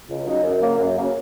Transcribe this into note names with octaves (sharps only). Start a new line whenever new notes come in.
C#2
C#3 F#3 D#4
F#2
C#3 F#3 A#3
F#2
C#3 F#3 A#3